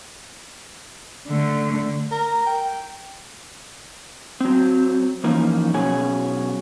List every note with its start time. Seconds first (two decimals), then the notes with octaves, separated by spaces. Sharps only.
1.27 D3 A3
2.11 A#4
2.46 G5
4.41 F#3 C4
5.24 E3 F3 A#3 C#4 D#4
5.74 B2 F#3 C#4 G#4 C#5 G#5